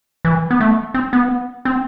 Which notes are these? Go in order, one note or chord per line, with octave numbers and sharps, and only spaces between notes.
E3
B3
A3
C4
B3
C4